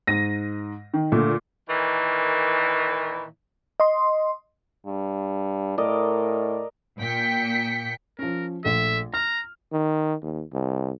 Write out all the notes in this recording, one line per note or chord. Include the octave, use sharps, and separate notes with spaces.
G#2 A#6 D#7
D#3
A#2 D3 A3
A#2 D#3 E3
D#5 C6
G2
A2 A#4 D5 D#5
A#2 G5 B6 C#7
F3 C#4 A#4
A#1 A3 E5
A#5 F6
D#3
D#2
C2